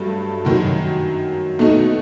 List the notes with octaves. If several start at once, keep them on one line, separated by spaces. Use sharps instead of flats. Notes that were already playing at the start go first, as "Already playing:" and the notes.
Already playing: G2 F#3 A3
F#2 D#3 F#3
B2 A3 D#4